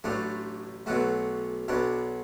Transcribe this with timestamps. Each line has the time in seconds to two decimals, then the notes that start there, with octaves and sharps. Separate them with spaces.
0.04 A1 A2 F#3 A3 D4
0.86 B1 B2 F#3 A3 F#4
1.68 B1 B2 F#3 D4